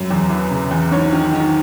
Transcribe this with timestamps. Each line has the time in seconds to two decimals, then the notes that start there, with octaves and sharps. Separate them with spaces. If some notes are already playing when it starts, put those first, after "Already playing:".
Already playing: F#2
0.11 E2
0.30 E3
0.50 C#3
0.71 E2
0.91 G#2 C#5
1.13 D#3
1.33 D#3